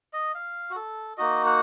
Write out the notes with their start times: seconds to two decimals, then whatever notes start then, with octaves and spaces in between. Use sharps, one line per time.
0.13 D#5
0.35 F5
0.70 F#4
0.76 A4
1.18 A#3 D#4 F#4 D#5
1.46 F#5